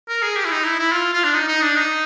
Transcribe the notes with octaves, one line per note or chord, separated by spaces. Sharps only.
A#4
G#4
G4
E4
D#4
E4
E4
F4
F4
D4
D#4
D#4
D4
D#4